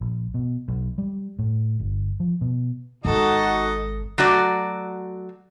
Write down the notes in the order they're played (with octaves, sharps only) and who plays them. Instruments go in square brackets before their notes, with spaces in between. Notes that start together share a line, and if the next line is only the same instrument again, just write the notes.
[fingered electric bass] A#1
B2
B1
G3
A2
G1
F3
B2
[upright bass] G#1 [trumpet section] D#4 F#4 [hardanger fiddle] A4 [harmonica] D#5
[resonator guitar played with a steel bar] F#3 A3 F#4 D5